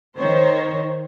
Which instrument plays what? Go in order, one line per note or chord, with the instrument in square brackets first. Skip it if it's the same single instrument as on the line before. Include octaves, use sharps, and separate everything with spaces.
[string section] D#3 C5 C#5